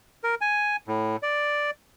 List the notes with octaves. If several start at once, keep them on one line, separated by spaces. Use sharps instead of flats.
A#4
G#5
A2
D5